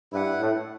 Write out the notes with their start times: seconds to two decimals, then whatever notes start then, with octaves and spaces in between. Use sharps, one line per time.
0.12 G2 E4 B4 F#5
0.40 A2